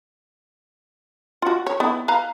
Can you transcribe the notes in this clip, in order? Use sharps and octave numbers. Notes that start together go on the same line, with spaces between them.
F4 F#4
C#5
B3 E4
B4 F5 A#5